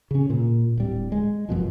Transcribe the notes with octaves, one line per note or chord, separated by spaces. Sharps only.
C#3 C#4
A#2
D1 G3
G#3
G1 F#2 B2 F3